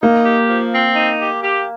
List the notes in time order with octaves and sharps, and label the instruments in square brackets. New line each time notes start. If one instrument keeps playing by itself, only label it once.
[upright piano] A#3 [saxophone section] D#4
[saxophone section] G4
F3
C4
D#4
G4
G4